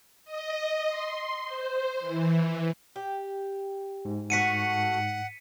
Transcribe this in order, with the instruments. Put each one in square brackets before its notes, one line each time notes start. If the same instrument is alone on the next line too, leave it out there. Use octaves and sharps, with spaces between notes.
[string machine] D#5
C6
C5
E3
[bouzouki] G4
[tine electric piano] G#2
[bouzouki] A3 F#4 [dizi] F#5 [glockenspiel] B6 C#7 D#7